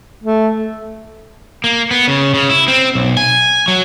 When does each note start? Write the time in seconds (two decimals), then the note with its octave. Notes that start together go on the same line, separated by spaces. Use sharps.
0.24 A3
1.64 A#3
1.91 B3
2.08 C#3
2.34 C#3
2.49 E4
2.68 C4
2.95 B1
3.17 G#5
3.68 F#3